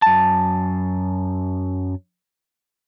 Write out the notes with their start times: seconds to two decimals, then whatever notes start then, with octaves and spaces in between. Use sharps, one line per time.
0.02 F#2 A5